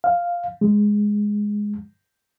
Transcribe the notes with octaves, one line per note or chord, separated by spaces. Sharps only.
F5
G#3